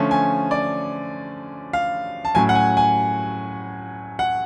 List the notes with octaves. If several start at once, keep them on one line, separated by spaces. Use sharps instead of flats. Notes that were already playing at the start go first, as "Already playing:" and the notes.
Already playing: D3 F3 A3 C#4
G#5
D5
F5
A5
A2 F#3 C#4 G#5
F#5
G#5
G#5
F#5